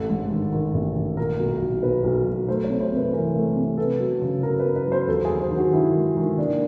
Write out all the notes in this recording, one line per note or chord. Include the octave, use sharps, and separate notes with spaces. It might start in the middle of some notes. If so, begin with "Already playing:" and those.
Already playing: A1 A4
G#2
D#3
D#3
A1
D#3
A#2 A#4
B1
B1
B1 B4
B1
B1
A3 C5
C#5
C3
C5
C3
B4
E3 A#4
A3
C3
B3 A4
F#3
C#3
F#3 A#4
B4
B3
B4
F#3 C5
D#2 A4
G#4
D#2
C5
D#3
F#4
D#3 E4
G#3
D#3
A#3 D4